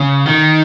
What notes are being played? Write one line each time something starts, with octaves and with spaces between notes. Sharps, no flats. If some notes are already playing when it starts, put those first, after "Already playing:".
Already playing: C#3
D#3